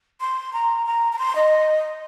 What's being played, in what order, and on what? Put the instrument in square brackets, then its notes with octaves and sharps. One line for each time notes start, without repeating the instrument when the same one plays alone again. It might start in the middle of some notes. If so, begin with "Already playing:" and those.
[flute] C6
A#5
A#5
A#5
C6
D#5